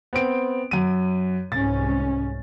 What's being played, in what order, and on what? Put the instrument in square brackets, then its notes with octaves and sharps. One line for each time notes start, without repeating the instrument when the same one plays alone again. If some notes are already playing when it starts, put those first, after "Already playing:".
[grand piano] B3 C4 D7
F#2 D#7
[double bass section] C2 G#2 C#4 [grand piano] A6